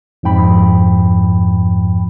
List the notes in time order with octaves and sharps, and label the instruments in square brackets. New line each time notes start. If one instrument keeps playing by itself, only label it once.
[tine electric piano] F2 G#2 F3 G5 B5